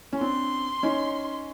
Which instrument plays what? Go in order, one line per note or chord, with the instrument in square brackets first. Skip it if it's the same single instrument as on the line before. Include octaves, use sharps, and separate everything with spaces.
[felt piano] C#4
[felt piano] C4 D4 [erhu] C6
[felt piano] C#4 D#4